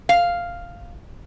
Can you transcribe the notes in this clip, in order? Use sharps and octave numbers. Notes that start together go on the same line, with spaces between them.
F5